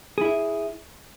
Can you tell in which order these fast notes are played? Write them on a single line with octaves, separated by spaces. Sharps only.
G#4 E4 E5